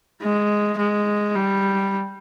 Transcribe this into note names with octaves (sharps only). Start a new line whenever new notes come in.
G#3
G#3
G3